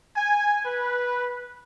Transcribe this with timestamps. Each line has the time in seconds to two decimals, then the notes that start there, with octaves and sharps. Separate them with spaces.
0.17 G#5
0.66 B4